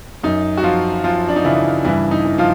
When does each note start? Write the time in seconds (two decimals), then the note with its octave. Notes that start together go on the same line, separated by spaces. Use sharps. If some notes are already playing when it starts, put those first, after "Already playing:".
0.23 F#2 D#4
0.57 F#4
0.63 F3 F4
1.04 F3 F4
1.29 D4
1.36 D#4
1.44 C#3 E3 E4
1.85 G2 E3 E4
2.11 D#4
2.25 E3
2.38 F3 F4